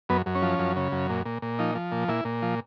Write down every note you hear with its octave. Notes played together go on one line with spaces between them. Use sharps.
F#2 B3
F#2
C#4
F3
F#2
C#3
F#2
A#2
A#2
A#2
F3 D#4
F3
A#2
A#2 E4
A#2
F3